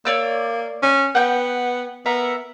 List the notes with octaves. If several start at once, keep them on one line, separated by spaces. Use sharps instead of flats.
A#3 C#5 D5 E6
C#4
B3 F#5 G5
B3 A#4 E5